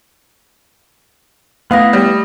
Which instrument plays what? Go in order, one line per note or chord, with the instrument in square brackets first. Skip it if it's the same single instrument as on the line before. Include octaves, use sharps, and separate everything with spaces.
[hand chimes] A3 D#6 A#6 [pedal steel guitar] B3 E4 [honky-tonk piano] F5
[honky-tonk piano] G3